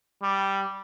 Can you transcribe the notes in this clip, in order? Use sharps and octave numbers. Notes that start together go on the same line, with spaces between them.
G3